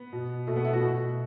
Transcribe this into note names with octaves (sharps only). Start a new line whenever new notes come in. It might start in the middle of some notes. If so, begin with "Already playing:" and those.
Already playing: B3
B2
B2 A3
B3
E4
F#4
B2